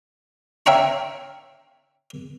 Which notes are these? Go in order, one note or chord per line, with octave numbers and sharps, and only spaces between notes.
C#5 E5 F5 G5 A#5 C#6